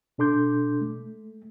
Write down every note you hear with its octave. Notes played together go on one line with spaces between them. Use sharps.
B2 D4 A4 C6 D6 G6
A3